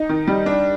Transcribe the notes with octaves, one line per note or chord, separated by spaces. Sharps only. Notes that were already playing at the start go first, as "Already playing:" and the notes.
Already playing: D#4
D#3
G3
D4